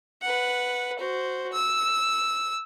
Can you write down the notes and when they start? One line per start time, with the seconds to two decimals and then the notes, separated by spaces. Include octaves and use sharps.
0.22 B4 F#5
0.99 F#4 C5
1.53 E6